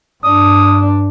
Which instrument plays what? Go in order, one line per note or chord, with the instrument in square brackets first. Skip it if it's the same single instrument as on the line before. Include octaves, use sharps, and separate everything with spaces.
[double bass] G2 D4 [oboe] D#6